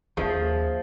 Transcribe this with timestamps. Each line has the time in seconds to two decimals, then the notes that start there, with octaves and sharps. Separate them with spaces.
0.17 D#2 F3 G#4 E5